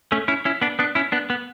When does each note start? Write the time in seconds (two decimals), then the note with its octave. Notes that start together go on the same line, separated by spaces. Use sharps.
0.12 A3 C#4
0.28 C#4 E4
0.45 C#4 E4
0.62 B3 D4
0.79 B3 D4
0.95 C#4 E4
1.12 B3 D4
1.30 B3